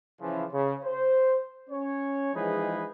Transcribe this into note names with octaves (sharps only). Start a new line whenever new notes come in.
C#3 E3 F3
C#3
C5
C#4 C#5
E3 F3 G#3 D#4 G#4 B4